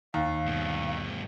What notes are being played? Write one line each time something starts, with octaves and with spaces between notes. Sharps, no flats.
D#2 F5
G2 B2